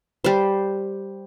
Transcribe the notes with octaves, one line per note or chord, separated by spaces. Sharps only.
G3 C5